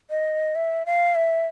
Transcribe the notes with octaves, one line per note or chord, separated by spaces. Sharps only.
D#5
E5
F5
E5